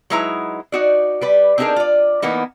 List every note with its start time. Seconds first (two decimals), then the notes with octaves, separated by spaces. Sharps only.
0.10 F#3 G#3 D#4 E4 B4 A#5
0.72 D#4 F#4 D5
1.21 G3 B4 D5
1.58 C4 D4 D#4 F#4 G#4 A#4
1.76 F4 D5
2.22 E3 A#3 B3 D#4